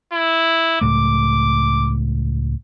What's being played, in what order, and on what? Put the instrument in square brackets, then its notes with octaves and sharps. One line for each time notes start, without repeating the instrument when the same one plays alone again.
[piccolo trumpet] E4
[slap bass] C#2 A2 A3 [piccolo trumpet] D6